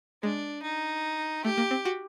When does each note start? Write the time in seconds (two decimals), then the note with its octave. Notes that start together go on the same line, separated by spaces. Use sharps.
0.23 G#3 D4
0.63 D#4
1.45 A3 G4
1.58 A#3
1.71 C4
1.85 F#4